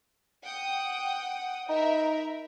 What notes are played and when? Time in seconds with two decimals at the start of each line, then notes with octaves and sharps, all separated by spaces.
0.44 F#5 G5 D#6
1.69 D#4 A#4 E5 B5